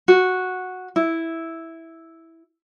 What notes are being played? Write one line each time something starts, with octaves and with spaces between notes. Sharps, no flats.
F#4
E4